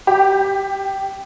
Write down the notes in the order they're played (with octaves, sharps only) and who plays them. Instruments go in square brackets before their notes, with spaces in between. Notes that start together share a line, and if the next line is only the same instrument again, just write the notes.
[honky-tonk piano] G4